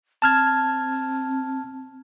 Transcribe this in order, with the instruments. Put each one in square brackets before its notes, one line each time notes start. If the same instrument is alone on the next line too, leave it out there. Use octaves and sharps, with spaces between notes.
[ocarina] C4 [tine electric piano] A5 F6 G#6